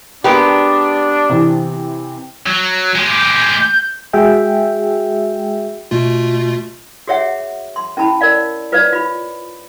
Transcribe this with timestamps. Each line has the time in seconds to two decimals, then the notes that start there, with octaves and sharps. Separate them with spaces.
0.24 G#3 A#3 B3 D4 G4
1.29 C3 E3
2.46 F#3
2.95 G#3 G4
3.19 G6
4.13 G#3 F#4 G#4 E5 G5
5.91 B2 A3 F4
7.08 F#4 G#4 C#5 E5 F#5
7.76 C6
7.97 C#4 E4 A5 B5
8.21 A#4 C#5 D5 F5
8.72 F4 B4 C#5 D5 F5
8.93 F4 B5